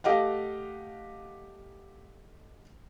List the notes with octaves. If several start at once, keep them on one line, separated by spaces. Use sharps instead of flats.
A3 G4 D#5 F5 F#5